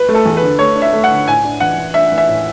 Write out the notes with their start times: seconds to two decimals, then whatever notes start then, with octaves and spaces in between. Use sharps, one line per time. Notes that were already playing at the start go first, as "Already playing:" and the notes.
Already playing: B4
0.09 A3
0.14 A4
0.26 E2
0.37 B4
0.43 D3
0.59 A3 C#5
0.76 D4
0.82 E5
0.93 A3
1.04 F#5
1.11 D3
1.27 A2 G#5
1.44 D4
1.60 E3 F#5
1.78 E3
1.94 D4 E5
2.12 E3
2.18 E5
2.28 A2